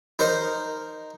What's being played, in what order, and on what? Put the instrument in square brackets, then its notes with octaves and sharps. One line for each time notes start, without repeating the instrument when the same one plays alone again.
[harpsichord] D#4 A#4 C5 D#5